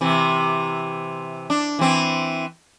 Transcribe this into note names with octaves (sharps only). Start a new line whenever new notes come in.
C3 E3
D4
E3 C4